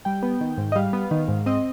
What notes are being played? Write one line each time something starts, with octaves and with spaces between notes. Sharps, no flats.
G3 G5
B3
D#3
G#2
D#5
G3 F5
B3
D#3
G#2
C4 D#5